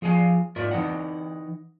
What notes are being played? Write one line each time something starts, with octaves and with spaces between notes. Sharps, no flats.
F3 G#4 F5 G#5
G#2 F4 A#4 D5 E5
E3 D#4 F#5